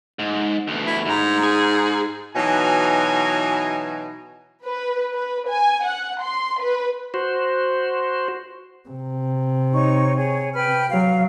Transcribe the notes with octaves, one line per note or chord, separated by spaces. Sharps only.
G#2
D2 B2
E4
D2 G#2 A#5
G#4
B2 E3 F#3 D#4 G#5
B4
B4
G#5
F#5
C6
B4
F#4 C5
C3
D#4 C#5 C#6
G#4 C#5
B4 G5 F6
F#3 F5